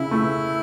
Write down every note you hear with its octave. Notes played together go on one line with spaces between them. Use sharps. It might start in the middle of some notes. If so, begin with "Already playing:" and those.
Already playing: C#3 E4
A3